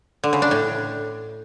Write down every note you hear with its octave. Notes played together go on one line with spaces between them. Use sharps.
D3
C#3
D4
A2